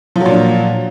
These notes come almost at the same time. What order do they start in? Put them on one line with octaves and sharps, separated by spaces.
F3 F#3 A#2 D4